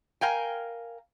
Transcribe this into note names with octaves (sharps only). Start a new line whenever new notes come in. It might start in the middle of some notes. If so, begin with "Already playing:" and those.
A#4 F5 G5 G#5